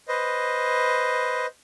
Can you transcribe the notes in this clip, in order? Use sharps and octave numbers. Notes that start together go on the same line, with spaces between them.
B4 C5 D#5